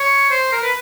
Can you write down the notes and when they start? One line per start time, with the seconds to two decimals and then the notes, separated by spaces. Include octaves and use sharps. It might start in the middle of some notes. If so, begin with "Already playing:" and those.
Already playing: C#5
0.30 C5
0.52 A#4
0.63 B4